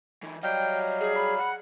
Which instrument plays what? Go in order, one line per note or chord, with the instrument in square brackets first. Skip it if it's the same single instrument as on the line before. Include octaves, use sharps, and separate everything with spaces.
[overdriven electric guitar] E3 D#4
[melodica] F#3 G3 F5 [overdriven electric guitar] D#5 [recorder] G5
[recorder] G#4
[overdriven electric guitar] B5
[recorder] F#5